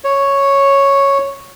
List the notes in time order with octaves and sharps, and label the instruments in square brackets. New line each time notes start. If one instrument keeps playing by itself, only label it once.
[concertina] C#5